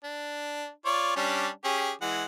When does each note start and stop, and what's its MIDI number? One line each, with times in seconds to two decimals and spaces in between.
0.04 0.69 62
0.85 1.15 65
0.85 1.15 73
0.85 1.15 74
1.16 1.48 55
1.16 1.48 61
1.16 1.48 62
1.64 1.91 61
1.64 1.91 67
1.64 1.91 68
2.02 2.24 52
2.02 2.24 56
2.02 2.24 78